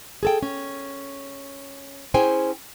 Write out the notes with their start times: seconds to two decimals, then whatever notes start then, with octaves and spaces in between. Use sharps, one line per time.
0.23 G#4 A4 G5
0.43 C#4
2.14 C#4 E4 G#4 C5 G5 G#5